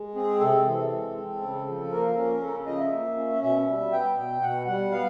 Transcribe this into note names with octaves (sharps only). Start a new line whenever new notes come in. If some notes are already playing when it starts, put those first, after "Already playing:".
Already playing: G#3
C4 G#4
C3 A4
E3
G#3
C4
C#3
F3
A#3 A#4
C#4
C#3 A4
F3 D#5
E5
A#3
C#4
B2 E5
G3
B3 G5
B2
B2 F#5
G3 F#5
B3 F5